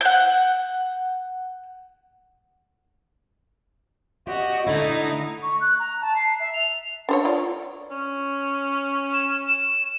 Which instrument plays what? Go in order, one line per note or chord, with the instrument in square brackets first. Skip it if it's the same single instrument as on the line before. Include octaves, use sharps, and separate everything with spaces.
[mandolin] F#5 G6
[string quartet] F#4 D#5 [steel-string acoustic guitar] G4
[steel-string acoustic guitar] D3 A3 E4 [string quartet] D#4
[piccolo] C#6
F#6
A#5
A5
C7
E5
F7
[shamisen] D4 C5 C#5
F4 D5
[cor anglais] C#4
[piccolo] E7
E7